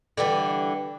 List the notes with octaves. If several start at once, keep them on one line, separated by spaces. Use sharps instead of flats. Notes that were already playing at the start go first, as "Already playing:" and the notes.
D3 E3 G3